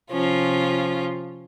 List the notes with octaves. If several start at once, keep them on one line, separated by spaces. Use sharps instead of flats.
C3 F3 C#4 F4